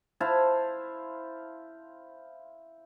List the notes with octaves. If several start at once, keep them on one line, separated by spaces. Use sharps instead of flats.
E4 C5 F5 A5